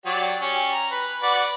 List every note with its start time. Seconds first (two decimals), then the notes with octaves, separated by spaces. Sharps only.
0.06 F#3 G4 D5
0.41 C#4 G4
0.73 A#5
0.91 B4
1.23 F#4 B4 D5